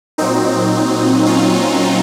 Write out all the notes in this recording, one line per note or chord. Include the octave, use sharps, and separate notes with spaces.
A#2 F#3 C4 D#4
C#4 F4